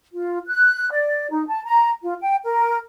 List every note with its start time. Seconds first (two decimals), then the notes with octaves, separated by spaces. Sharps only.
0.12 F4
0.47 F#6
0.91 D5
1.30 D#4
1.47 A5
1.64 A#5
2.02 F4
2.21 G5
2.44 A#4